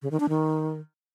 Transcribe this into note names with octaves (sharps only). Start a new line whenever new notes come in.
C#3
D#3
D4
D#3